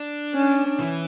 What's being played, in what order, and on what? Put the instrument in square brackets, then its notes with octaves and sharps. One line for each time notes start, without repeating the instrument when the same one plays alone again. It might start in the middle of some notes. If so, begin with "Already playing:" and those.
Already playing: [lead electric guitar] D4
[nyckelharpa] C#4
[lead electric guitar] E3